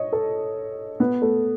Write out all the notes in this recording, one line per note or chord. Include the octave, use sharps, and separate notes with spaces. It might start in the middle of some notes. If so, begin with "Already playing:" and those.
Already playing: C#5 D#5
A4
B3
A3